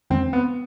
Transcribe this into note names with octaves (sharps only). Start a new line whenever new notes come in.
F2 D#3 G#3 C4 D4
B3